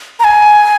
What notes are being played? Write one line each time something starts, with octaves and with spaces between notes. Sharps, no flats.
A#5
G#5